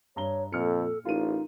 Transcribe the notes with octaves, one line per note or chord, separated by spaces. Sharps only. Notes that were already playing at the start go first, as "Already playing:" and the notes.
G2 C#5 A#5 G7
F2 A#2 A4 F6 C#7
A1 D#4 F4 A#4 D#7